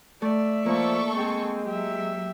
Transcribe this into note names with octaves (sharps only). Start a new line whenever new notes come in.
A3 D5 E5
F3 A#3 A4 C#6
G#3 C4 G#4
F#3 G4 E5